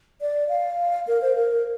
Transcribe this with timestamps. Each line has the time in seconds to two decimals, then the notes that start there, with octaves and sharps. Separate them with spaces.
0.21 D5
0.49 F5
1.07 A#4
1.22 C5
1.36 A#4